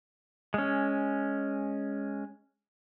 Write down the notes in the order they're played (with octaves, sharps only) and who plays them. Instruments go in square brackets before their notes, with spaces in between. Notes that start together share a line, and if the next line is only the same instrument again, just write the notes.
[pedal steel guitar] G#3 C#4